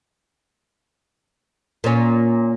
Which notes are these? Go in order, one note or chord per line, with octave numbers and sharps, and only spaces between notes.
A#2 C#4